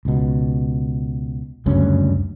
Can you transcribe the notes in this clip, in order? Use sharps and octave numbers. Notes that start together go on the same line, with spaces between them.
C#2 B2
F#1 D2 G2 C#4